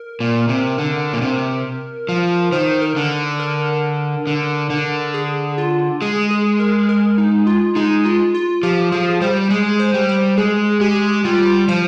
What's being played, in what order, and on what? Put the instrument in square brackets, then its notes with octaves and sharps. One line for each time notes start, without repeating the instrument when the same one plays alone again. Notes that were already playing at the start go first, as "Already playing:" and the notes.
Already playing: [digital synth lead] A#4
[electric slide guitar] A#2
C3
D3
A#2
C3
F3
[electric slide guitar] D#3 [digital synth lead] C5
[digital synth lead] A#4
[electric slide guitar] D3
[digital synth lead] A#4
[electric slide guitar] D3
D3
[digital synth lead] G#4
F4
[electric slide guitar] G#3 [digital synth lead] G#4
[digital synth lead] G#4
A#4
A#4
D#4
F4
[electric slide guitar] G#3 [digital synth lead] D#4
[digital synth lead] F4
F4
[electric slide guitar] F3 [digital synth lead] G4
[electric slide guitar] F3 [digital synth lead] G#4
[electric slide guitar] G3 [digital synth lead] C5
[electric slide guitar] G#3 [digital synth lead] G#4
[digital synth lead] C5
[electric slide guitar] G3
[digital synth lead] C5
[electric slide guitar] G#3 [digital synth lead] G#4
[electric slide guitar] G#3 [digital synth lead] G4
[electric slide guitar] G3 [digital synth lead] F4
[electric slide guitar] F3 [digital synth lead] C5